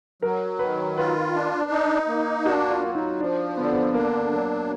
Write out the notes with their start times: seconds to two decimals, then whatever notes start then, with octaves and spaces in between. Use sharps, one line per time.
0.22 F#3 A#4
0.59 D#3 B4
0.97 F4 B4
1.35 D4
1.71 D#4
2.08 A#3
2.45 D4 F#4
2.70 F4
2.83 F#3
2.95 D#4
3.20 F3 D4
3.57 D3 B3
3.64 D4
3.72 B3
3.93 A#3 D4
4.32 F#3